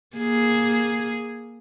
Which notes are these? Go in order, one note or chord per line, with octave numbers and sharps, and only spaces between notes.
A#3 G#4